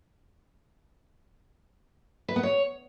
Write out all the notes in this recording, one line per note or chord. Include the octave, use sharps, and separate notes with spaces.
B4
B3
C#5